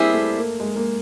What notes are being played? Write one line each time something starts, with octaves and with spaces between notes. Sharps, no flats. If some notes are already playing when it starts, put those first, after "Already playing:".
Already playing: G3 A#3 C4 E4 G#4
A3
A#3
G#3
A#3